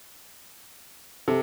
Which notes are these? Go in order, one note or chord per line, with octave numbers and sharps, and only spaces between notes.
C3 A4